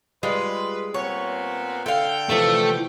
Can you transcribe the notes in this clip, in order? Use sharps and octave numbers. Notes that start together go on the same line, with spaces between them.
G3 G#3 F4 B4
A#2 B3 C4 C#5
D3 A4 E5 F5 G5
C3 E3 F3 A3